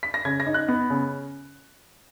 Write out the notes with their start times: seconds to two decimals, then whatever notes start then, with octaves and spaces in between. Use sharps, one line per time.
0.03 B6
0.14 A#6
0.25 C#3 G#6
0.40 A#6
0.47 D#4
0.54 F#6
0.68 B3
0.90 C#3